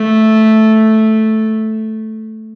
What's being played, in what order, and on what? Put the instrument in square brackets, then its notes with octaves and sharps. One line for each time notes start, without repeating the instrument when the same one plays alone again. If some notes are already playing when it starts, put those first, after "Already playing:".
Already playing: [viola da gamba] A3